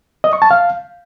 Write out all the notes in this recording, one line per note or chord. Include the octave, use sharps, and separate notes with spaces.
D#5
C#6
A5
F5